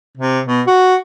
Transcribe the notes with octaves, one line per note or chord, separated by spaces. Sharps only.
C3
B2
F#4